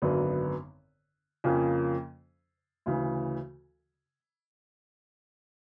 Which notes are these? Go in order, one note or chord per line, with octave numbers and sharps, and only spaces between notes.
G#1 F#2 D3 F#3 B3
F2 C#3 F3 A#3 C#4
D2 C#3 E3